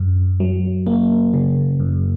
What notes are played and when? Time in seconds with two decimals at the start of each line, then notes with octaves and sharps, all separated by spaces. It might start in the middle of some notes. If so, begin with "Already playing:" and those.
Already playing: F#2
0.40 F#3
0.87 A#3
1.34 C#3
1.80 F#2